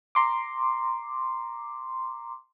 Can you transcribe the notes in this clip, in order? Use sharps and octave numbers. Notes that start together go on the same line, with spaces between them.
A#5 C6 D6